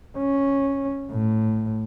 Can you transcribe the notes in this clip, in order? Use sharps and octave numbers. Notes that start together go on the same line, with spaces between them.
C#4
A2